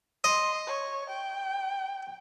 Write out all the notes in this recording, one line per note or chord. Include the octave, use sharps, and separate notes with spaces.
D#5 C6
C#5
G5